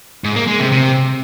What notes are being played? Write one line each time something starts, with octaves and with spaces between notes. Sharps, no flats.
G#2
A#3
G#3
C3
C3